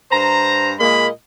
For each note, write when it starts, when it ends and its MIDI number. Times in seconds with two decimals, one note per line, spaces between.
0.11 0.72 43
0.11 0.72 72
0.11 0.72 82
0.80 1.08 46
0.80 1.08 56
0.80 1.08 58
0.80 1.08 75
0.80 1.08 83